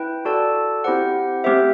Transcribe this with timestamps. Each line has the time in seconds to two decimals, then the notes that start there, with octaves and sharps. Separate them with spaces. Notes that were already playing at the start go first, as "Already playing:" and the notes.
Already playing: E4 B4 G5
0.25 F#4 A4 D5 A5
0.84 C4 E4 G4 C5 F#5
1.44 A3 C4 G4 C5 E5